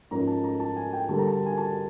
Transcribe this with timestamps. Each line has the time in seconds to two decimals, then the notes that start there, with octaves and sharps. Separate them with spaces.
0.11 G#2 F3 A#3 C#4 A#5
0.27 A5
0.44 A#5
0.60 A5
0.76 G#5
0.93 G5
1.09 D3 G3 A#3 A5
1.18 A#5
1.27 A5
1.46 G#5
1.58 A5